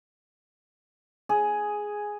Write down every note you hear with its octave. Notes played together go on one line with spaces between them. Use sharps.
G#4